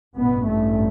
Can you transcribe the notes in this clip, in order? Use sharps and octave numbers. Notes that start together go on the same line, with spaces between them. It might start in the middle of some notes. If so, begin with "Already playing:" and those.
A1 G2 B2 B3
A2 A3